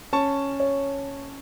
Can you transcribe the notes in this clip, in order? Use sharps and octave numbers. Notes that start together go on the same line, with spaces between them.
C#4 A5 C#6
C#5